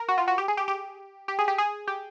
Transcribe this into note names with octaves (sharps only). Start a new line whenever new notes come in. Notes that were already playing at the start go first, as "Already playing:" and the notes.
Already playing: A#4
F#4
F4
F#4
G4
G#4
G4
G4
G4
G#4
G4
G#4
G4